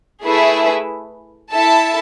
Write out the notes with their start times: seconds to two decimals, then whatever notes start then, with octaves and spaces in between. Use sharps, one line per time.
0.24 A3 E4 G#4 B4 E5
1.52 E4 A4 E5 A5